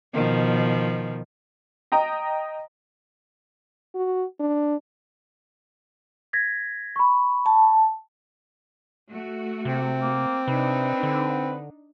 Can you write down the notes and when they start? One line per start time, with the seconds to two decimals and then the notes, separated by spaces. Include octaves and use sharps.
0.14 B2 D#3 F3
1.92 D#5 G5 A#5
3.95 F#4
4.40 D4
6.33 G#6 A#6 B6
6.96 B5 C#6
7.46 A5
9.09 A3 F#4
9.65 C3 C4
10.02 A#3
10.47 C3 D4 D#4 B4
11.03 D3